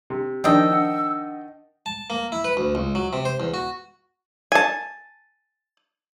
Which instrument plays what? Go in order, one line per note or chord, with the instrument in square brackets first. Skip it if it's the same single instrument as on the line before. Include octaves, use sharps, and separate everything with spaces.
[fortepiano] C3
[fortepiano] D#3 D#4 D5 [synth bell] F3 D4 [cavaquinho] D#5 G5 [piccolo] E6
[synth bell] D4 F#5
[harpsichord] A5
A#3
E4
B4
D2
C#2
F#3
C3
C5
E2
F#4
[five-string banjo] G#5 A5